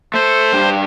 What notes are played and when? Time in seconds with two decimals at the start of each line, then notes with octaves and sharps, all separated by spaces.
0.14 A3 C5
0.53 G2 G4